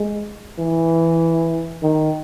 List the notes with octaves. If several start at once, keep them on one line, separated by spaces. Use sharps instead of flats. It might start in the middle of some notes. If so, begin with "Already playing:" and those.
Already playing: G#3
E3
D#3